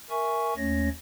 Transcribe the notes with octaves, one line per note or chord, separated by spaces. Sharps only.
A#4 E5 G#5 C#6
D#2 A3 C#4 C#5 A#6